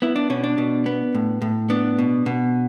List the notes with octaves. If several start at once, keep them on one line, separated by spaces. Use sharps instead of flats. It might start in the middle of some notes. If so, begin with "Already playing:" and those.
B3 E4
D4
B2 C#4
D4
B2
B3
A2
A2
B3 D4
B2
B2